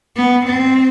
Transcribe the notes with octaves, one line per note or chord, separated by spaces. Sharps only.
B3
C4